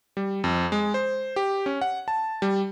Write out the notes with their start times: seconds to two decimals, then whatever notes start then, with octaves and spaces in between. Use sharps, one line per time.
0.17 G3
0.44 F2
0.72 G#3
0.94 C5
1.36 G4
1.66 C#4
1.81 F#5
2.08 A5
2.42 G3